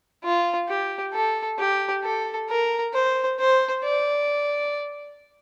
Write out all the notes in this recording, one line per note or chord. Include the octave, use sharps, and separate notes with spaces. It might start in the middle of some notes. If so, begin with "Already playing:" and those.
F4
G4
A4
G4
A4
A#4
C5
C5
D5